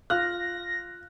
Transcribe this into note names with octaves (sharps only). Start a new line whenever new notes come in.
F4 F6 F#6 A#6